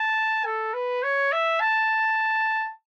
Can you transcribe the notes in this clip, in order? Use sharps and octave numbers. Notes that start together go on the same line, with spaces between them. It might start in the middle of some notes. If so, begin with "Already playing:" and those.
Already playing: A5
A4
B4
C#5
E5
A5